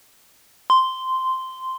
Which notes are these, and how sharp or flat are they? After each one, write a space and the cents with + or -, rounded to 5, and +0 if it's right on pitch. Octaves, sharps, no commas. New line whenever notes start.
C6 -10